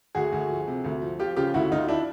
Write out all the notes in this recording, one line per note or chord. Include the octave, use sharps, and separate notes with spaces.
D2 F#4 G#4
D2
F3
C3
D2
F3
F3 F4 G4
C#3 F4 G4
D2 E4 F#4
D2 D#4 F4
D4 E4